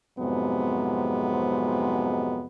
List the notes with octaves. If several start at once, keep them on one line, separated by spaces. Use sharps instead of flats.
F2 G#2 C3 F#3 G#3 B3